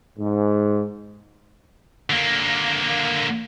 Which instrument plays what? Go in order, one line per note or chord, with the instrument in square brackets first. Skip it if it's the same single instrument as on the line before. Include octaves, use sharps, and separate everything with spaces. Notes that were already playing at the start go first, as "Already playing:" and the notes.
[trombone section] G#2
[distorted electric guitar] D3 A#3